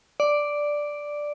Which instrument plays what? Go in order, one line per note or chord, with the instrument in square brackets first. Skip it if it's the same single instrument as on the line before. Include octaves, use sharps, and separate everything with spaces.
[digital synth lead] D5